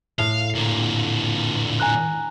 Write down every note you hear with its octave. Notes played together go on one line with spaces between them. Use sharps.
A2 F5
A#2 D3
G#5 A#5 F#6